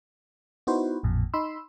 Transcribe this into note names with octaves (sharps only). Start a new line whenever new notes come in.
B3 D#4 E4 F#4 B4 C5
A1 F2 A#2
D#4 B5 C6 E6